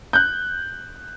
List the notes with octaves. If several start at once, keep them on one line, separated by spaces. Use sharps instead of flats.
F#6 G6